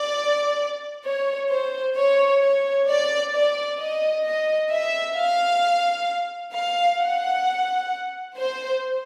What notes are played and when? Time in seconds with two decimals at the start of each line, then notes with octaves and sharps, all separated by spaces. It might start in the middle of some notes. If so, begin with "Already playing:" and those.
Already playing: D5
1.06 C#5
1.51 C5
1.97 C#5
2.42 C#5
2.88 D5
3.34 D5
3.80 D#5
4.25 D#5
4.70 E5
5.16 F5
6.53 F5
6.99 F#5
8.37 C5